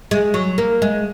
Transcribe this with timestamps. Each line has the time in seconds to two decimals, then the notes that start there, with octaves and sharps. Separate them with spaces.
0.11 G#3
0.34 F#3
0.58 A#3
0.82 G#3